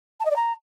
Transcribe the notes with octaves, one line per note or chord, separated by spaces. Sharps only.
A5
D#5
D5
A#5